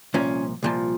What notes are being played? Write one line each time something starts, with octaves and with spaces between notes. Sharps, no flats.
C2 A#2 F3 C#4
C2 A#2 F3